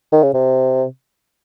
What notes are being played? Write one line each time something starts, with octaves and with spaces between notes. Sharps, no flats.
D#3
C#3
C3